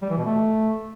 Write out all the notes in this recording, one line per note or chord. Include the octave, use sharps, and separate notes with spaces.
G3
E3
B2
A3